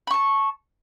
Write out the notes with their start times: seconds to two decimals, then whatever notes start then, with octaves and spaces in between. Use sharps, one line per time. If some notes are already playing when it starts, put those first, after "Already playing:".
0.07 B5
0.11 C#6
0.14 A5